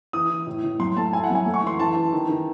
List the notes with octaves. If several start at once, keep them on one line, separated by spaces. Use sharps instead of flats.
E3 D#6
E3
A2
A2
F#3 C6
A3 A5
E4 G#5
F#5
F#3
G#5
A3
C#6
E3 C6
E3 A5
E3
D#3
D#3